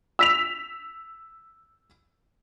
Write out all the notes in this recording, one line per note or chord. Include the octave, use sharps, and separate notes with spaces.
E6 B6 F7